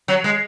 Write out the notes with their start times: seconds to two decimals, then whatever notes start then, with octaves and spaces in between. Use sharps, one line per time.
0.08 F#3
0.24 G#3